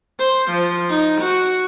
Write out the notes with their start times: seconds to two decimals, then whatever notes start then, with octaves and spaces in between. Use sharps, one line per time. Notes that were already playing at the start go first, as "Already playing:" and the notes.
0.19 C5
0.51 F3
0.90 D#4
1.21 F#4